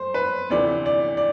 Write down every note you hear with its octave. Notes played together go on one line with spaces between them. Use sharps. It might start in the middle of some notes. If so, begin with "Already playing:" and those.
Already playing: F#2 A3 C5
B4
D2 C3 E3 A3 D5
D5
D5